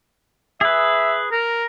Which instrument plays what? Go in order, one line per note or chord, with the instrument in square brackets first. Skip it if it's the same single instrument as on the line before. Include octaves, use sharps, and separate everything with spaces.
[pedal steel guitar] G#4 B4 [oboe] E5
[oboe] A#4